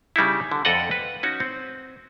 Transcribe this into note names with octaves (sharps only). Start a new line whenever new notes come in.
C#3 G3 D#4 E4
D3
F2 A4 D5 D#5 F#5
B4
C#4 D#4 F#4
C4